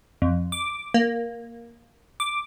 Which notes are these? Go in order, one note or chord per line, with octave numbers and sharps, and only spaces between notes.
F2
D6
A#3
D6